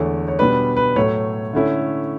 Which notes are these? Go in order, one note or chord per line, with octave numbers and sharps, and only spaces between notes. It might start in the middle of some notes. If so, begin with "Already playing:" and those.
Already playing: E2 D3 A3 C#5
C#5
B2 G3 D4 B4
B4
A2 F#3 A3 C#5
D3 A3 C#4 E4